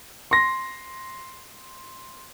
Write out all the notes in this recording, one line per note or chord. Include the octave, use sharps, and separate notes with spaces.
C6 A#6